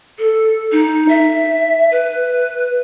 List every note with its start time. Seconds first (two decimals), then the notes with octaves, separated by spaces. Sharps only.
0.19 A4
0.72 D#4
1.09 E5
1.91 B4